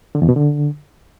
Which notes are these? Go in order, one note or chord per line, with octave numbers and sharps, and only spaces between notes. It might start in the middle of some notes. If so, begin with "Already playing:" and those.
D3
E2
B2
D3